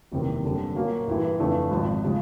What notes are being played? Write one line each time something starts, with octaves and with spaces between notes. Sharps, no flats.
F#1 E2 C3 D#3
F#2 D3 G3
A#2 F#3 A#3 C#4 F#4
A1 G2 E3
F2 C#3 E3 A3 D4
G#1 G#2 F3
C#3 F3 G#3